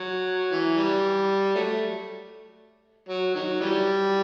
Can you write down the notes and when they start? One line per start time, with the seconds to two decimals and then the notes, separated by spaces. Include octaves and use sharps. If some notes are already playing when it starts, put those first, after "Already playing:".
Already playing: F#3
0.52 E3
0.77 G3
1.55 F#3 A3
3.08 F#3
3.35 D#3 F#3
3.61 E3 G3